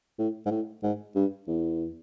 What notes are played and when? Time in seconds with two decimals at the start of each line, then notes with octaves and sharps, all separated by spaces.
0.18 A2
0.46 G#2
0.51 A2
0.83 G#2
1.15 G2
1.47 E2